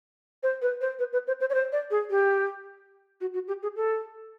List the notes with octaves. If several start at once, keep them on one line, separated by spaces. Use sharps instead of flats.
C5
B4
C5
B4
B4
C5
C5
C#5
C5
D5
G#4
G4
F#4
F#4
G4
G#4
A4